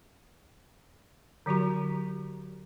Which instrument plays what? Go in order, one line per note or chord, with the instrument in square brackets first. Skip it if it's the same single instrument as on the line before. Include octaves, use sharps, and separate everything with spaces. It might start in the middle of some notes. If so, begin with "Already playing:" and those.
[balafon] D3 F#3 F#4 G4 A#5